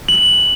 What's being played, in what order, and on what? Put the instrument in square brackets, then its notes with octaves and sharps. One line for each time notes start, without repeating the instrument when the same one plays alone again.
[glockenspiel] F#7